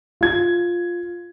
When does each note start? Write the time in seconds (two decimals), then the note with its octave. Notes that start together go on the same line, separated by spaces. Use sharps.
0.21 F4 G#6